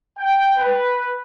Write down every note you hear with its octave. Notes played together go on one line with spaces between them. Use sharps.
G5
B4